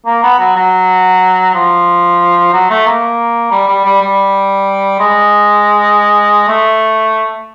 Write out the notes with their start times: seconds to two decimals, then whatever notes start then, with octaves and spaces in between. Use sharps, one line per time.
0.06 A#3
0.23 B3
0.39 F#3
0.56 F#3
1.54 F3
2.53 F#3
2.70 A3
2.86 A#3
3.51 G3
3.68 G3
3.85 G3
4.01 G3
5.00 G#3
6.48 A3